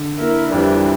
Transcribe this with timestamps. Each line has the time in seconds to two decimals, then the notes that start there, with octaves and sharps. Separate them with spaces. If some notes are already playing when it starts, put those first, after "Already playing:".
Already playing: D3
0.18 A#3 E4 A#4
0.52 F2 E3 G3 D4